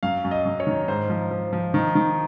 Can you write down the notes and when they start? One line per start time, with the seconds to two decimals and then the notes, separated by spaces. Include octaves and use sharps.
0.03 F#2 F5
0.24 F#2
0.31 D#5
0.45 F#2
0.60 C#5
0.67 D#3
0.88 G#2 C5
1.10 F3
1.31 F3
1.53 F3
1.74 D#3
1.95 D#3